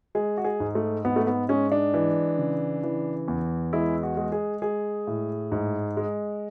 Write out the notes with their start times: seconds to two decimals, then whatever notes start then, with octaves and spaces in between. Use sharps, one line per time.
0.15 G#3 G#4
0.37 F#4
0.44 G#4
0.60 G#2
0.75 A3
1.05 G#2 B3
1.16 A3
1.27 B3
1.49 G#3 C#4
1.72 D4
1.94 E3
2.38 C#3
2.83 E3
3.28 E2
3.73 G#3 E4
4.03 F#4
4.17 G#3
4.32 G#4
4.62 G#3 G#4
5.07 A2
5.52 G#2
5.97 G#3